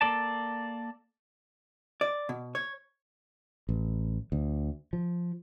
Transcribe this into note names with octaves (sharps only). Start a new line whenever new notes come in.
A#3 A4 D5 A5
D5
B2
C#5
A1
D2
F3